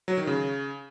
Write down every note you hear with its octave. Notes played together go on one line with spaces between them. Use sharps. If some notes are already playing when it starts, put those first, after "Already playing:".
F#3
D#3
C#3